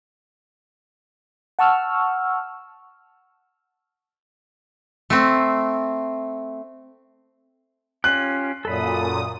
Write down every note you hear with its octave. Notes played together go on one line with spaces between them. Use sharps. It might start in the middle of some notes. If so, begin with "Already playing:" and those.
F#5 A5 C#6 E6 F6
A3 C4
C#4 F4 G4 F#6
F#2 A#2 A4 B5 D#6